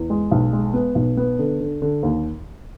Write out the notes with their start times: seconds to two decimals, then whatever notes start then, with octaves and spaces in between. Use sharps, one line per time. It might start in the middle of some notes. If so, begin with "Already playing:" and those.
Already playing: E2
0.10 G#3
0.31 B1
0.53 G#3
0.74 B3
0.95 B1
1.17 B3
1.39 D3
1.60 D3
1.82 D3
2.03 D#2